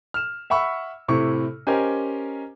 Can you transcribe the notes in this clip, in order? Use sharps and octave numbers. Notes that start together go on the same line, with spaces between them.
F6 E7
E5 F#5 B5 C#6 E6
A2 C3 E4 C#6
C#4 G4 A#4 C5 D#5 G#5